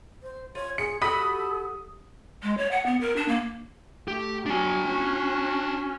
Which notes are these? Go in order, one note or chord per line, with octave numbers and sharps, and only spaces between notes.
C5
F4 C#5
G#4 C#7
F#4 G4 A4 F#5 B5 D#6 B6
G#3
C#5
F#5
B3
A#4
D4
A#3
A3 G4
F#3 D4 G#5
C#4 F#4